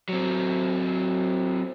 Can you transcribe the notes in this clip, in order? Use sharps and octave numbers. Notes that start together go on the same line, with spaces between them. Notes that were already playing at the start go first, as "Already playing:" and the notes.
F#3 C4